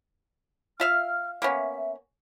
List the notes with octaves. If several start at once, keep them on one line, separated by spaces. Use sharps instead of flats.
F4 E5 F5 F6
A#3 B3 C#4 E5